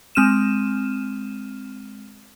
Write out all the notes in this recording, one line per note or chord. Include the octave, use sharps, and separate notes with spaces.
G#3 C4 F6 D#7 E7